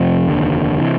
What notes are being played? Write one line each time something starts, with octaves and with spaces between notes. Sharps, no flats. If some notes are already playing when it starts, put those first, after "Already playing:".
Already playing: F2 C3 F3
F1 D#2 D3
C3 E3